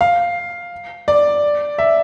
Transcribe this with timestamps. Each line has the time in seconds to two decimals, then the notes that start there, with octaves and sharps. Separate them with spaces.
0.01 F5
1.08 D5
1.78 E5